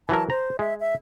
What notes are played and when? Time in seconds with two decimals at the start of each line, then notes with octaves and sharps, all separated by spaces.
0.09 E3 F#3 A#4 A5
0.30 C5 A#5
0.59 G#3 E5
0.80 E5